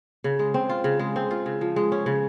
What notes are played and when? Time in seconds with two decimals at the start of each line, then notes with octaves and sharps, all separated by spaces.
0.24 C#3
0.39 G#3
0.54 C4
0.69 F4
0.84 C#3
0.99 G#3
1.16 C4
1.31 F4
1.46 C#3
1.61 F3
1.76 G#3
1.92 C#4
2.06 C#3